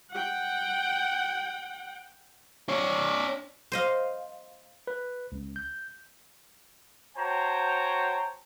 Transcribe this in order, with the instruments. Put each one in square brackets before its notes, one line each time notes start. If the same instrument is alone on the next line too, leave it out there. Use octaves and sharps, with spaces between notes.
[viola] F#5 G5
[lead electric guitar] D4 C#5
[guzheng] C5 D#5 F5
[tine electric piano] B4
C#2
G6
[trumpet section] F#4 C5 C#5 G5 A5 A#5